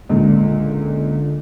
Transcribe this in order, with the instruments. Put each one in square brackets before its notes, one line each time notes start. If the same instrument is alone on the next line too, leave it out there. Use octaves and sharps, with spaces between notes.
[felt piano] C#2 A#2 [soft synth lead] D3